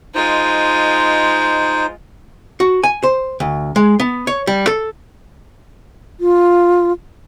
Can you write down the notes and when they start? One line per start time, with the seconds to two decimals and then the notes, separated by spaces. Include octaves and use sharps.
0.15 G#3 D#4 F4 C5
2.60 F#4
2.83 G#5
3.03 C5
3.40 D2
3.76 G#3
4.00 B3
4.27 C#5
4.47 G3
4.67 A4
6.20 F4